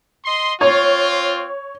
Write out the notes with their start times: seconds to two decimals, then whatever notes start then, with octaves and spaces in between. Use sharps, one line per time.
0.25 D#5 C6
0.61 C4 F4 C#5